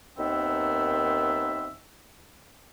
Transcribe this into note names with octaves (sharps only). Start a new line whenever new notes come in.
D#2 D#3 B3 C4 E5 E6